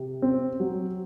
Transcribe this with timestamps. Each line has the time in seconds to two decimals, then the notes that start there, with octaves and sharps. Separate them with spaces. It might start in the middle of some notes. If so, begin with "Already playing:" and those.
Already playing: C3
0.22 C4
0.60 F#3